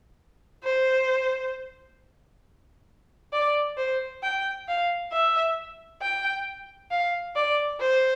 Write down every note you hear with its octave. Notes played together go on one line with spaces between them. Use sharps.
C5
D5
C5
G5
F5
E5
G5
F5
D5
C5